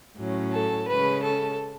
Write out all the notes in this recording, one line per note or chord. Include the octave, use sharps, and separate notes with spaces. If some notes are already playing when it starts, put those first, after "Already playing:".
A2 F#3 C#4
A4
C#3 G#3 C#4 B4
A4